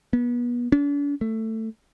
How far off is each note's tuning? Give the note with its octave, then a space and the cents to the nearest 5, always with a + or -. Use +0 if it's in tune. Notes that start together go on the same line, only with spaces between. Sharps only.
B3 -30
D4 -45
A3 +15